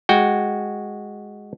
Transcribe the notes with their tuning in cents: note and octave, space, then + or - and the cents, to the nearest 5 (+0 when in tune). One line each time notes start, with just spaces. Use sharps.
G#3 +0 F#4 +0 G5 +0